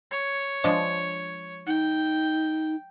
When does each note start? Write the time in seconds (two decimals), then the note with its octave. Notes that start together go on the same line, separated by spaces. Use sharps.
0.11 C#5
0.64 F3 G#3 D4
1.67 D#4 G5